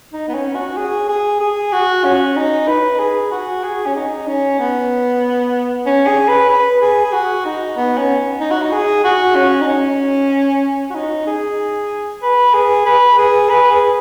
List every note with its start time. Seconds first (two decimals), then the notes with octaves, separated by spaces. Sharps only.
0.13 D#4
0.28 B3
0.34 C#4
0.55 F#4
0.77 G#4
1.09 G#4
1.41 G#4
1.73 F#4
2.05 C#4
2.36 D#4
2.68 B4
2.99 G#4
3.31 F#4
3.64 G#4
3.86 C#4
3.95 D#4
4.27 C#4
4.59 B3
5.86 C#4
6.07 G#4
6.28 B4
6.49 B4
6.82 G#4
7.05 G#4
7.13 F#4
7.45 D#4
7.77 B3
7.98 C#4
8.40 D#4
8.51 F#4
8.62 D#4
8.72 G#4
9.04 F#4
9.36 C#4
9.61 D#4
9.67 C#4
10.90 F#4
10.95 D#4
11.27 G#4
12.22 B4
12.54 G#4
12.86 B4
13.18 G#4
13.50 B4
13.71 G#4